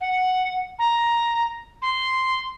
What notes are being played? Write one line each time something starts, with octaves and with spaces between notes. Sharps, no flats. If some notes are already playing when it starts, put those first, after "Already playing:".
F#5
A#5
C6